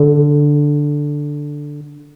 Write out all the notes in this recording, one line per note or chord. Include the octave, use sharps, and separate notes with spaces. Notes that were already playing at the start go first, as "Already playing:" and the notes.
Already playing: D3